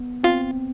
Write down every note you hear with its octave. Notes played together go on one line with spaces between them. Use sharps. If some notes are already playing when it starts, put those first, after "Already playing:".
Already playing: B3
C4 F4